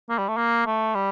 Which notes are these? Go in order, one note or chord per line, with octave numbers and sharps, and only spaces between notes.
A#3
G3
A3
A#3
A3
G3